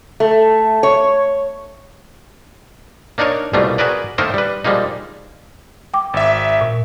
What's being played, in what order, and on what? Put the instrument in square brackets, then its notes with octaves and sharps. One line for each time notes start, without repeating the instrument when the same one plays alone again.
[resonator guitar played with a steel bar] A3
C#5
[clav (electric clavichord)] A#3 D4 D#4 A#4 C#5
C2 B2 G3 A3 A#3 F4
F#4 G#4 A#4 B4 D5
D#3 A3 A#3 D#4 A#4 C5
G3 B4
F3 G3 G#3 A#3 D#4
[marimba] G5 D6
[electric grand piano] G#1 E5
[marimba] A#2